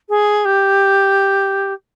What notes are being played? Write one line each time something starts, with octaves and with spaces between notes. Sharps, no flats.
G#4
G4